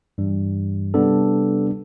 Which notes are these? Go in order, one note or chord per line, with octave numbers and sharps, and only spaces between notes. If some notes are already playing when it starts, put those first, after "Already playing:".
G2 E3 G3
C3 G3 B3 D4 A4